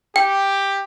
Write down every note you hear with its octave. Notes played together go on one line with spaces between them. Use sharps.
G4 G5